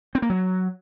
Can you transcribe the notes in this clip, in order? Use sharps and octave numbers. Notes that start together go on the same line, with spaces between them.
C4
A#3
F#3